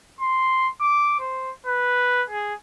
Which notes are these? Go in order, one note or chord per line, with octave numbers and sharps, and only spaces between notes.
C6
D6
C5
B4
G#4